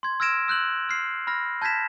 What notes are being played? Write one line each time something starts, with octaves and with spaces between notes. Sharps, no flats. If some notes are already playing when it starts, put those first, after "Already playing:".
C6 G#6
E6 F6 G#6 A#6 D7 E7
E6 F#6 G6 F#7
F6 C7
B5 F6 A#6
A5 G6 G#6 A#6 B6 E7